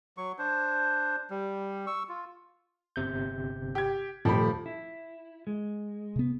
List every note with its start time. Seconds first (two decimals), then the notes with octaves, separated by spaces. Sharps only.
0.17 F#3 C#6
0.39 D4 C5
1.30 G3
1.87 C#6 E6
2.09 F4
2.96 G1 C3 G6
3.75 G4 G#6
4.25 D#1 F3 A3 G4 B5
4.66 E4
5.47 G#3
6.16 C3 B3